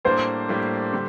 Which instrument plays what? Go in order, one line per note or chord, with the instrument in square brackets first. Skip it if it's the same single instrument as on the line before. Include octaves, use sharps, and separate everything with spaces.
[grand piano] A2 G3 A#3 D4 [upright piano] C5
[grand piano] A2 G3 A#3 D4
D3 G3